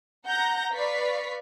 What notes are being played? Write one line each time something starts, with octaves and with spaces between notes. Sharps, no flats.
F#5 A#5 G6 A#6
B4 D5 F5 C#6 B6